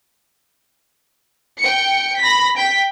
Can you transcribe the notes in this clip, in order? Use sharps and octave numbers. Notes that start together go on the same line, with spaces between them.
G5 C#7
B5 A#6 B6
G5 B6